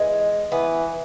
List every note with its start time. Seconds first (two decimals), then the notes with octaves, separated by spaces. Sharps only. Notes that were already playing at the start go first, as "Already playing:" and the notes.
Already playing: E3 G#3
0.52 E3 B3